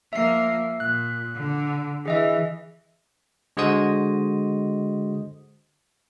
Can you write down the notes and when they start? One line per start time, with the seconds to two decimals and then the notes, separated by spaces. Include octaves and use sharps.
0.13 F3 A#3 E5 C7
0.80 A#2 F#6
1.36 D3
2.06 E3 G#4 D#5 E5
3.57 D3 G#3 F#4 C5 D#5 D#6